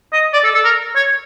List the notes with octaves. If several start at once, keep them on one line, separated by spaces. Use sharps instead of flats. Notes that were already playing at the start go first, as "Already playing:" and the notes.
D#5
D5
A4
A4
A#4
C#5